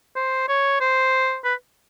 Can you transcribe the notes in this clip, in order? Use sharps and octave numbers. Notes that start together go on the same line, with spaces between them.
C5
C#5
C5
B4